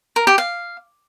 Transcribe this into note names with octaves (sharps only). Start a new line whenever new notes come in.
A#4
G4
F5